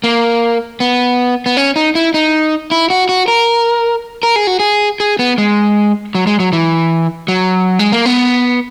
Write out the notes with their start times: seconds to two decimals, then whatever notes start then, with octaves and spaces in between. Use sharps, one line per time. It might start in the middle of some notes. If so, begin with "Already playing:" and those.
0.04 A#3
0.80 B3
1.46 B3
1.57 C#4
1.76 D#4
1.95 E4
2.14 D#4
2.71 E4
2.90 F#4
3.09 F#4
3.28 A#4
4.23 A#4
4.36 G#4
4.47 F#4
4.60 G#4
5.00 G#4
5.19 B3
5.38 G#3
6.15 F#3
6.27 G#3
6.40 F#3
6.53 E3
7.28 F#3
7.79 G#3
7.92 A#3
8.06 B3